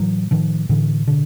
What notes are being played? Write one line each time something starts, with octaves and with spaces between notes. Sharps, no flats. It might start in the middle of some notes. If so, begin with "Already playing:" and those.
Already playing: A2 E3 F#3
A2 D#3 F3
A2 D3 E3
B2 D3